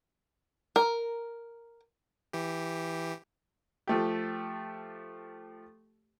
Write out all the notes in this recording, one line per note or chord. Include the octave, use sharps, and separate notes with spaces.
A#4
E3 G4
F3 A3 G4